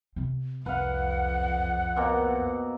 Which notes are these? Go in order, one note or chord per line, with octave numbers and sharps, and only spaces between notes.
C3 C4
C2 F2 B4 F5 F#5
B2 A#3 C4